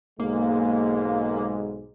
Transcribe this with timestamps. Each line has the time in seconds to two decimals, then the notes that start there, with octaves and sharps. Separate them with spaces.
0.20 B1 G#2 G#3 A#3